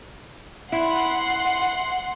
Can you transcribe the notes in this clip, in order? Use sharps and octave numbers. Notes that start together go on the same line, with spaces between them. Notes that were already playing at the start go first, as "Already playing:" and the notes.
E4 F#5 C6